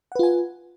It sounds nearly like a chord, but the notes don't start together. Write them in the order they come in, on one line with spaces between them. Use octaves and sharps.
F#5 B4 F4 G#5